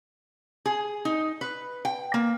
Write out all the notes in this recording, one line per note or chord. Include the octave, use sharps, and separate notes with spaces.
G#4
D#4
B4
G5
A#3